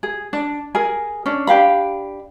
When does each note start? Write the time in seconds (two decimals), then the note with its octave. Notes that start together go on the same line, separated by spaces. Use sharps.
0.03 G#4
0.33 D4
0.75 G#4 A#4 G#5
1.26 C#4 D4
1.47 D4 G4 F5 B5